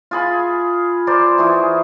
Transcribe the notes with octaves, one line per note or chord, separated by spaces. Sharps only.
F4 G#4 B5
A#4 C5 D5 C6
E3 F#4 G#4